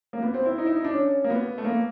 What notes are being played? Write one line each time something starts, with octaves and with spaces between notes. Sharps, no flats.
A#3
B3
C4
E4
D#4
E4
D#4
D4
C#4
A#3
B3
A3
A#3